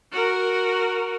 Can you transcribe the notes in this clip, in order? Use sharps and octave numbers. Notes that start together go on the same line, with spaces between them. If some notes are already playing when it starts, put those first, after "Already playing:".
F#4 A#4